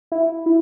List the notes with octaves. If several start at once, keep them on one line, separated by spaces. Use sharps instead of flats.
E4
E4